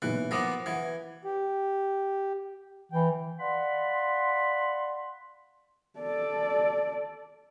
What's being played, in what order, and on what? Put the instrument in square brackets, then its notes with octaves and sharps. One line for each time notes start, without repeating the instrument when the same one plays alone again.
[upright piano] B1 A#2 F#6 [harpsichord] E3
[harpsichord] F3 A#3 B3 [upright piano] D6 D#6 A#6
[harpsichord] E3 [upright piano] B4 F#5 G#6
[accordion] G4
[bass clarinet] E3 [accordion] G5
[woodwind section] D5 F5 F#5 B5 C6
[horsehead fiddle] A4 D5